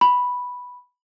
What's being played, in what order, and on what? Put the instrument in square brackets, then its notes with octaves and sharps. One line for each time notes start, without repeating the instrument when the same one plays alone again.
[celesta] B5